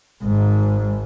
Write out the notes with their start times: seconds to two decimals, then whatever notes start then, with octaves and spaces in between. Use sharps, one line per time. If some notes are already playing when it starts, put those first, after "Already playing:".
0.23 G#1 G#2